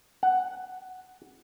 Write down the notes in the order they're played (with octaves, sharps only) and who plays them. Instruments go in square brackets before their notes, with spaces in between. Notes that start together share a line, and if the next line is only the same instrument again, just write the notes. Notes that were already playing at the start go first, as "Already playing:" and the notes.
[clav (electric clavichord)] F#5